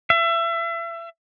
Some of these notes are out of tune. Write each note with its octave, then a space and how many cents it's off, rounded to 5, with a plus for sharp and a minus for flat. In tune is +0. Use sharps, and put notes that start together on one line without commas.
E5 +30